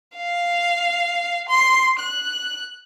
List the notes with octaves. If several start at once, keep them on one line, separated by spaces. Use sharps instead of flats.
F5
C6
F#6